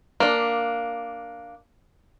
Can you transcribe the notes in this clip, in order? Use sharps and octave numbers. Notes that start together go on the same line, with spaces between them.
A#3 D4